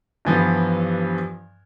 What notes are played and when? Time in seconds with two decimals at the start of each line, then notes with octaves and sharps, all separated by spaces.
0.25 G2 E3 F3 B3